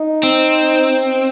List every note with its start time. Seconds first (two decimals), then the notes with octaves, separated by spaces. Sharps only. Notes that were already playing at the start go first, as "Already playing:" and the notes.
Already playing: D#4
0.23 C4